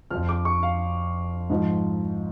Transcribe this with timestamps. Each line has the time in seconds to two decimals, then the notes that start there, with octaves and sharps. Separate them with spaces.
0.11 F2 F3 F6
0.29 D6
0.45 C#6
0.63 F5
1.50 G#2 F3